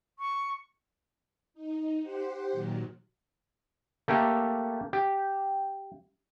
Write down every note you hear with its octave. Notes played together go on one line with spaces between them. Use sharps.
C#6
D#4
G4 C5 F#5
A#2 D#3 F#3
A3 A#3 G4 A4
G4